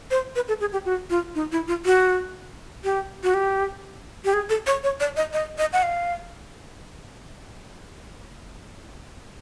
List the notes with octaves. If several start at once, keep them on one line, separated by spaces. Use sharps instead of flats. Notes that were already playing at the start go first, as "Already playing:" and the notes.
C5
B4
A4
G#4
G4
F#4
F4
D#4
E4
F4
F#4
G4
F#4
G4
G4
G#4
A4
C#5
C#5
D5
D#5
D#5
D#5
F#5
F5